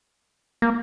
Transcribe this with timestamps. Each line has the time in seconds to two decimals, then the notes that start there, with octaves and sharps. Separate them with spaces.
0.62 A#3